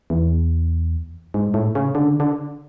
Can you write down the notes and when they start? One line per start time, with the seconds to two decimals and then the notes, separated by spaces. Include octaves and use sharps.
0.10 E2
1.34 G#2
1.54 A2
1.75 C#3
1.95 D3
2.20 D3